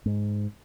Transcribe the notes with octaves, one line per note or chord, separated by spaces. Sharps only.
G#2